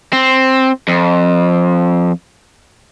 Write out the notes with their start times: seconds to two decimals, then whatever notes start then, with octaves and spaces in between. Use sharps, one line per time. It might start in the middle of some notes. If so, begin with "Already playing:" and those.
0.13 C4
0.88 F2